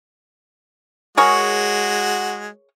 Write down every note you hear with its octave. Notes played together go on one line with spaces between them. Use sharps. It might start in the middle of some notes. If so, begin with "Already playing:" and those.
G#3 F#4 G#4 A#4 C#5